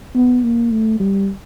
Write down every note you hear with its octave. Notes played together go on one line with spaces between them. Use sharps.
B3
A#3
A3
G3